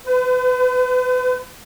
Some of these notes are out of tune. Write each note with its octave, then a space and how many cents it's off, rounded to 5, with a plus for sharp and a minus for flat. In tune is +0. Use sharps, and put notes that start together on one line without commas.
B4 +45